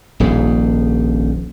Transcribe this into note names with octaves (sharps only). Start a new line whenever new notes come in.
D#1 A#1 G#2